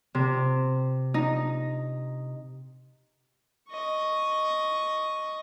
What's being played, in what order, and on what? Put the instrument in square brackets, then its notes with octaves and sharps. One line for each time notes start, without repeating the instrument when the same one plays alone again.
[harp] C3
D#4
[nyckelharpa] D#5 C#6